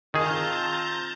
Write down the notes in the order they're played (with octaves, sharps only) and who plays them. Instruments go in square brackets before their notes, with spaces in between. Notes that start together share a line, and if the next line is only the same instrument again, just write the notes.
[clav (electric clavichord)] D#3 G#4 [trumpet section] C4 F4 [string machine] A5 A#5 G6